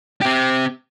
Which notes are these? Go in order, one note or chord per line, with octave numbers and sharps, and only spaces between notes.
C4 G4